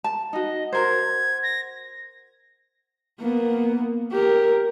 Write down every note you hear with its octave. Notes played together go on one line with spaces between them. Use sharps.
A5
D#4 F#4 D#5
F#4 A#4 C5 G#6
A#6
A#3 B3
G4 A#4